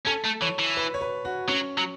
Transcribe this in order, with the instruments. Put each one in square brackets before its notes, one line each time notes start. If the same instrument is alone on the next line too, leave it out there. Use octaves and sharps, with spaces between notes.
[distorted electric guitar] C#4 [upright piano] A4
[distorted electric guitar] A3
[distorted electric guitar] E3 [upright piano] C#5
[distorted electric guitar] E3
[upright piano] B4
C#5
B4
F#4
[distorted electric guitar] F#3 [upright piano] C#4
[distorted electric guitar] F#3